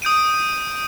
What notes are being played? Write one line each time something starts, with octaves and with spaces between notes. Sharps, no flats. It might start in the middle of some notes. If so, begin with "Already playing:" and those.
D#6 G6 D7 D#7